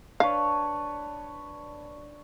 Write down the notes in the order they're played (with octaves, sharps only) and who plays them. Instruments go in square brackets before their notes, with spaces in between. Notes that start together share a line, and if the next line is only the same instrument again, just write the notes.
[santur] D4 B4 C#5 [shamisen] F5